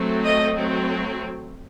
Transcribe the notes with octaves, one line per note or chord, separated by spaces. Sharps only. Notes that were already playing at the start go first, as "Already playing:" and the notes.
Already playing: F#3 A3 C4
D#5
F#3 A3 C4